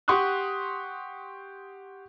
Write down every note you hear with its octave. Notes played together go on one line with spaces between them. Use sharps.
G4 F#5 C6 C#6 D#6 F#6